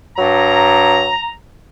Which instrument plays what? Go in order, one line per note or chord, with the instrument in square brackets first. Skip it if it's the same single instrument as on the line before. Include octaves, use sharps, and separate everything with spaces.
[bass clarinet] G2 [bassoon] F#3 [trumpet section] A#5